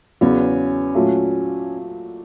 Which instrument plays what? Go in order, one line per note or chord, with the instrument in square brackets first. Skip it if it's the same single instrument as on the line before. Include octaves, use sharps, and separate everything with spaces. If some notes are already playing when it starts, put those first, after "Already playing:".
[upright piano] E2 C#3 F#3 B3 [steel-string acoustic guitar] C#4
[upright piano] A#2 F#3 A3